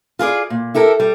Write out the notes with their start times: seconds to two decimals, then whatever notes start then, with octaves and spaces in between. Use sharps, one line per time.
0.19 F4 G#4 A#4 D5
0.50 A#2
0.75 E4 G4 A4 A#4
1.00 G3